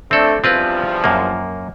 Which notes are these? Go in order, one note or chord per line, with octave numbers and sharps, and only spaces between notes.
A3 C4 D4 A4
E2 G2 F3 C4 F4 B4
F#2 A#3